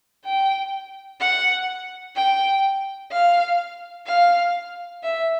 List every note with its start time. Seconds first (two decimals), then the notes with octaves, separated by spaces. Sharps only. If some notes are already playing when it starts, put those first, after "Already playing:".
0.25 G5
1.21 F#5
2.16 G5
3.12 F5
4.07 F5
5.03 E5